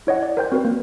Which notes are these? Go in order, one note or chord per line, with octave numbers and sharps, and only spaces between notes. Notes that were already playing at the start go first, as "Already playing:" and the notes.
E4 C#5 D#5 F#5
D5
A#4 C5 G5 G6
C4 F#4 A#4 B4
A#3